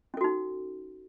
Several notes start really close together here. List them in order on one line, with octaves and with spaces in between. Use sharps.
C#4 A4 F#4 D#4